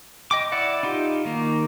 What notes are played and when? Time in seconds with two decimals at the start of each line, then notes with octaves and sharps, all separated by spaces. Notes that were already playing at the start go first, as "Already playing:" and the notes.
0.31 D#5 G5 D6
0.52 E4 D5 F#5
0.83 D#4 F4 G4
1.25 D#3 A#3